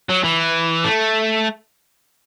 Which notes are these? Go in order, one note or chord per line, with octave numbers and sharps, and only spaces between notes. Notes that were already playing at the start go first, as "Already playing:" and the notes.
F#3
E3
A3